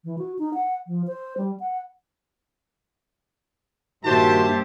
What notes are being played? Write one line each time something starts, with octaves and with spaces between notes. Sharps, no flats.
E3
F#4
D#4
F#5
F3
C5
G3
F#5
G2 A#2 D#3 F#4 G4 C5 E5 A5